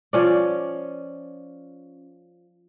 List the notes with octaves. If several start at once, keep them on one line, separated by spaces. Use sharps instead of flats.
F3 C#4 D5